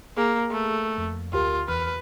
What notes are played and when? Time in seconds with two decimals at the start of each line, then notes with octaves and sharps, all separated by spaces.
0.17 A#3 G#4
0.51 A3
0.98 F2
1.33 D2 F4 G4 A#4
1.68 E2 B4 F6